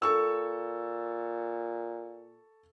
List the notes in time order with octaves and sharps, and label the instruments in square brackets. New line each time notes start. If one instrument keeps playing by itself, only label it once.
[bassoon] A#2 [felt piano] A4 C#6 E6